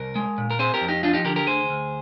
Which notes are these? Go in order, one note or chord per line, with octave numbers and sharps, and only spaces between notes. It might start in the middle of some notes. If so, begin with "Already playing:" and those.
Already playing: C2 A#4
G#3
A#2
A#4
C4 G#4 C5
G4 A#4
F2
D#4 G4
F3 D4 F4
D#4 G4
D3 G4 A#4
G4 A#4
D2 G#4 C5
D2